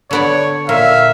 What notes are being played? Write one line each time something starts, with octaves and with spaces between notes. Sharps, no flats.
D3 B3 C#5 D5
A#2 E5 F5